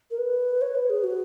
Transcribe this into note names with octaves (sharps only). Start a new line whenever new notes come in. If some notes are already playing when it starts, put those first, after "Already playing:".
A#4
B4
C#5
B4
G#4
F#4